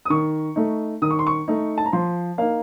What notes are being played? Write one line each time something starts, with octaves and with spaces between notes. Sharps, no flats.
D#6
D#3 C#6
A3 D#4
D#3 D#6
C#6
C6
C#6
A3 D#4
A5
A#5
F3 C6
A#3 D#4 F5